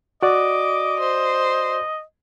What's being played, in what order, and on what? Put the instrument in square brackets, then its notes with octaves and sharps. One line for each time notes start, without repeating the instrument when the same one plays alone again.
[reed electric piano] F#4 D5 [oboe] D#5 [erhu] D6
[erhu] C5